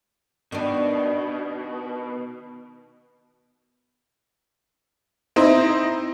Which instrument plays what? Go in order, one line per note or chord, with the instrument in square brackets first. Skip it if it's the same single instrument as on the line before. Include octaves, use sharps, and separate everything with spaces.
[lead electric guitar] B2 [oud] D#3 D4
[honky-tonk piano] C4 D#4 E4 C5